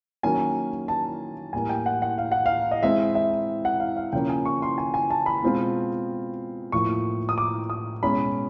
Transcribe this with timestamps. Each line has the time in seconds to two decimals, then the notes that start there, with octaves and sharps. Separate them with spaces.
0.23 D#3 F#3 A#3 C#4 G#5
0.88 A5
1.53 A2 E3 G3 A#3 G#5
1.69 G5
1.86 F#5
2.02 F#5
2.18 F5
2.32 F#5
2.46 F5
2.71 D#5
2.83 E3 G#3 C4 E4 E5
3.15 E5
3.65 F#5
3.80 F5
3.97 F5
4.13 C#3 F3 A#3 C#4 E4 G5
4.29 G#5
4.45 C#6
4.62 C6
4.78 G#5
4.94 G#5
5.10 A5
5.26 B5
5.42 B2 G#3 C4 F4
6.72 A2 F3 A#3 C#6
7.29 D#6
7.38 D6
7.70 D#6
8.03 B2 G#3 C#4 E4 B5